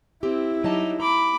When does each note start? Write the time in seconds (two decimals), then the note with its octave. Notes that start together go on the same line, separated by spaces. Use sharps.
0.23 C4 E4 G4
0.64 F#3 D#4 G4 D#5 A5
1.00 A#5 B5 D6